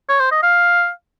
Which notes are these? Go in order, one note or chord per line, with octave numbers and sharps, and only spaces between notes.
C#5
C5
D#5
F5